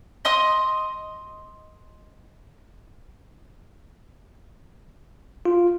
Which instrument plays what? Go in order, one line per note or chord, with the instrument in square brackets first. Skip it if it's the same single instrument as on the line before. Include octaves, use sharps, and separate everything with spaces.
[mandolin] D#5 C6 D#6
[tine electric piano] F4